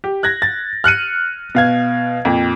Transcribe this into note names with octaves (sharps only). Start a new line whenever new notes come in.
G4
F#6 G#6 A#6
A6
F6 F#6 C#7 D#7
B2 F5 G#6
F2 A#2